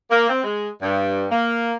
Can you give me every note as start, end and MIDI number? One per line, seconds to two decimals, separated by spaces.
0.11 0.28 58
0.29 0.40 60
0.44 0.68 56
0.82 1.25 43
1.31 1.74 58